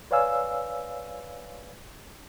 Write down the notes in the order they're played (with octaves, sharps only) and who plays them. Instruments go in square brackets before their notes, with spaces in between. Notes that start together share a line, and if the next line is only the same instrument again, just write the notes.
[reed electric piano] B4 C#5 D5 F5 G#5 E6